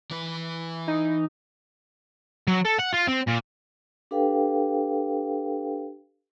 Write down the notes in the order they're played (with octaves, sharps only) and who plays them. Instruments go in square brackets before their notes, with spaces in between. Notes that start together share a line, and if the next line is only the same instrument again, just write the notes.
[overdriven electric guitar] E3 B4
[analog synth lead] D#4
[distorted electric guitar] F#3
A4
F#5
F4
C4
A#2
[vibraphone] D4 G4 A4 B4 F5 G5